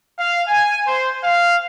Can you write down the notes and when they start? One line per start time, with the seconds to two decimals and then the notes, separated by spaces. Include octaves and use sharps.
0.18 F5
0.47 G#5
0.86 C5
1.23 F5